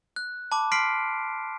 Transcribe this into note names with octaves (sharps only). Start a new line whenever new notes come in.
F#6
A5 B5 D6
C6 F6 B6 C7 D7